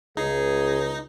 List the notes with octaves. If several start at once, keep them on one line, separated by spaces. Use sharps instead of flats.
C#2 D#4 G#4